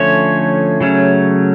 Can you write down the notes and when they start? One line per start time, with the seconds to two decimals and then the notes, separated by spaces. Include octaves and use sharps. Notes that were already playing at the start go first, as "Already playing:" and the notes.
Already playing: D3 F3 A3 C#4 C#5
0.81 C#3 F#3 A3 C#4